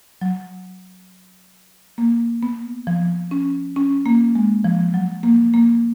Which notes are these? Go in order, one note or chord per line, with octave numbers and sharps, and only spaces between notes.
F#3
A#3
B3
F3
C#4
C#4
A#3
G#3
F3
F#3
A#3
A#3